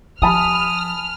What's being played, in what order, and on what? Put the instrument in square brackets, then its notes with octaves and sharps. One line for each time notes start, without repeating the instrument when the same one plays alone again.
[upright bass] F3 [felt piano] G#5 A5 B5 [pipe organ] D#6 [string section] F6